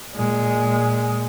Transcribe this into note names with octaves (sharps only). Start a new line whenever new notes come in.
A#2 G#3